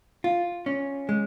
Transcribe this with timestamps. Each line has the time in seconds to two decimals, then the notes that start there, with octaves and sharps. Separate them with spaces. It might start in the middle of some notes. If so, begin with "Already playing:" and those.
0.24 F4
0.66 C#4
1.09 G#3